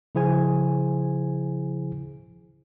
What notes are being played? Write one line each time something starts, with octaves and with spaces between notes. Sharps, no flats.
C#3 F3 E4 G#4 C5 G#5